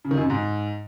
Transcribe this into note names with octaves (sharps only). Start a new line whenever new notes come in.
C#3
D#3
F#2
C3
G#2